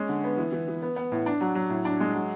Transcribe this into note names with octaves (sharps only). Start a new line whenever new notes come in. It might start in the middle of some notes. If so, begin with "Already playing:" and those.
Already playing: G#3 C#4
D3
B3
E3
E3
E3
B3
B3
A2
D4
F#3
F#3
A2
D4
G#3
F#3